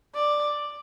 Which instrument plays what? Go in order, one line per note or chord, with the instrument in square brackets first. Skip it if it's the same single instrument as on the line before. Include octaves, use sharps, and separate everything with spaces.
[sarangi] D5